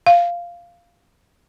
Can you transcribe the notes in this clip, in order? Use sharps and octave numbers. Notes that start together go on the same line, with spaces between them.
F5